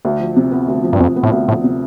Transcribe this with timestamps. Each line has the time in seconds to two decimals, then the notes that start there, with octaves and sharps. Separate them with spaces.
0.05 D2
0.20 F3
0.37 C3
0.52 B3
0.68 D2
0.83 F3
0.93 G2
1.00 F2 C3
1.16 B3
1.23 A2
1.32 D2
1.48 A2 F3
1.64 C3